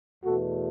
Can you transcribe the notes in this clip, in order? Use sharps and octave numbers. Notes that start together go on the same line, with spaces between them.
E2 B2 A3 F#4 A4